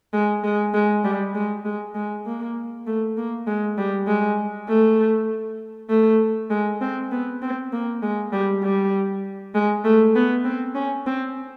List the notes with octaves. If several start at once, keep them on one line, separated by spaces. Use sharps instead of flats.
G#3
G#3
G#3
G3
G#3
G#3
G#3
A#3
A3
A#3
G#3
G3
G#3
A3
A3
G#3
C4
B3
C4
A#3
G#3
G3
G3
G#3
A3
B3
C4
C#4
C4